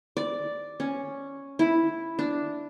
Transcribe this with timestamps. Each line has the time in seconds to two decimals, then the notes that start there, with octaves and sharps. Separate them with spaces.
0.17 D5
0.80 C#4
1.59 E4
2.19 D4